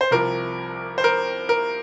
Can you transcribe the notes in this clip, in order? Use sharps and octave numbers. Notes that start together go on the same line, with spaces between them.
C5
C2 C3 F3 A#4
C5
A#4
A#4